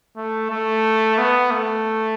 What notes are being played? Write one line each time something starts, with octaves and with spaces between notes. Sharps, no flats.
A3
A3
B3
A3